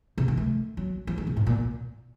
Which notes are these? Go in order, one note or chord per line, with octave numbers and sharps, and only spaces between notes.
C3
D#3
A3
F#3
F3
D#3
C3
A2
A#2